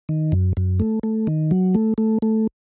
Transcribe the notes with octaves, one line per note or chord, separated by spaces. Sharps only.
D#3
F#2
F#2
A3
A3
D#3
F#3
A3
A3
A3